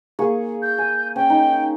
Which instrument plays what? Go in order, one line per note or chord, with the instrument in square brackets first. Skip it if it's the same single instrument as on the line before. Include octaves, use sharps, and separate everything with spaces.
[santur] A#3 G#4 C#6
[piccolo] G6
[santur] G#5
[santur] C#4 [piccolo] G5
[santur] D#4